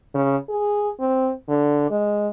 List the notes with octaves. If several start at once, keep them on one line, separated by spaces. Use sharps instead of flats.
C#3
G#4
C4
D3
G#3